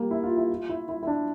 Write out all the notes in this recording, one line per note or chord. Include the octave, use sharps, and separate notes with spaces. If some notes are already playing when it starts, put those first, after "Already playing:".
Already playing: G3 A#3
E4
F4
E4
F4
E4
E4
E4
D4